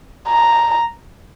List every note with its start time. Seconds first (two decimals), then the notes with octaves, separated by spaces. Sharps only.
0.29 A#5